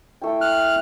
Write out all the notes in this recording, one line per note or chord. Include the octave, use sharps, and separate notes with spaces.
A3 E4 G5
F6 F#6